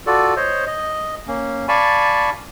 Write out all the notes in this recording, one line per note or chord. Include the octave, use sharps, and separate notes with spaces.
F4 F#4 A4 D5
C5 C#5 D#5
D#5
A#3 C#4
D5 F5 G#5 A5 B5 C#6